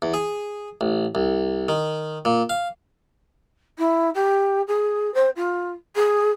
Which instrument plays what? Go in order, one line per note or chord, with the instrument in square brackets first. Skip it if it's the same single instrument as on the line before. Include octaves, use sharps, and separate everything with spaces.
[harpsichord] E2
G#4
A1
C2
D#3
A#2
F5
[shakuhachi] E4
G4
G#4
C5
F4
G#4